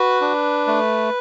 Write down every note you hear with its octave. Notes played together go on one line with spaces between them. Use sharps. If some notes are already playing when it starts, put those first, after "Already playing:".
Already playing: F#4 B4
D4
A3